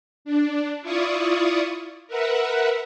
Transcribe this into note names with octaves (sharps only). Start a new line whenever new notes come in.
D4
E4 F4 D5 C#6 D#6
A#4 B4 E5 F#5